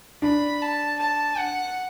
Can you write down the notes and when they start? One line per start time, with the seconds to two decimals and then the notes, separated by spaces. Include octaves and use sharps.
0.22 D4 B5
0.62 A5
0.99 A5
1.38 F#5